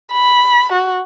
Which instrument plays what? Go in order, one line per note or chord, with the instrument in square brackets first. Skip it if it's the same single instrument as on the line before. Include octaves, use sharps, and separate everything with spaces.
[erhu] B5
F#4